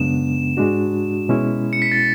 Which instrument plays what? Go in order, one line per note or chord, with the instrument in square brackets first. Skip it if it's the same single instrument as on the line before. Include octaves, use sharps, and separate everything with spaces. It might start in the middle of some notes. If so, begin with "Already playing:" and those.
Already playing: [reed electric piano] F#2 C#3 G#3 B3 D4 [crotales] E7
[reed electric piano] G#2 G#3 D4 F#4
B2 G#3 C#4 E4
[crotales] C#7
B6
A6